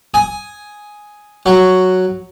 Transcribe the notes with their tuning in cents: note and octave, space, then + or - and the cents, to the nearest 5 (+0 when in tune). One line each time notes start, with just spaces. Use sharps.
G#5 +0 D#6 +5
F#3 +0 F#4 +0